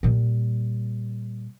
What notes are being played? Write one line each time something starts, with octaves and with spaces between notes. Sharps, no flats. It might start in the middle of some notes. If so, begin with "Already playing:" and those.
A#2 G3